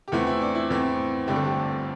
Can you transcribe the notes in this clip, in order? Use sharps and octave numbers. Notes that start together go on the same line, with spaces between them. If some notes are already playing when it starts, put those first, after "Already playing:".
G4
E2 E3 A3 C4 E4
E4
D4
E4
E2 E3 A3 C4 E4
G1 G2 D3 A3 C4 G4
A4
G4